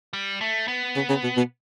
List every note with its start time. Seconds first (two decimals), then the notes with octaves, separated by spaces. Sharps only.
0.13 G3
0.41 A3
0.68 B3
0.96 C#3
1.09 C#3
1.23 B2
1.37 B2